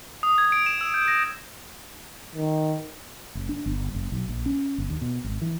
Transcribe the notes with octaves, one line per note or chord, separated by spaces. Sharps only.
D#6
G#6
D7
E7
E6
G6
A#6
D#3
F#1
D4
G1
F#1
B1
A#1
C#4
G1
D#2
B2
G#1
E3